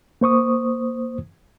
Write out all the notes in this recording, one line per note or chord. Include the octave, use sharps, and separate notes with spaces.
A#3 C5 C#6 D#6